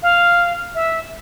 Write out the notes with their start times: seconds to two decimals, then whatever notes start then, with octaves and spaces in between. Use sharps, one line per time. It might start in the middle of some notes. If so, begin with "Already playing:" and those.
0.03 F5
0.75 E5